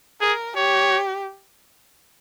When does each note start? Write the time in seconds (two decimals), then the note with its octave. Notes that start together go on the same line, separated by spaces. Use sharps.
0.22 G#4 A#4
0.56 G4 C#5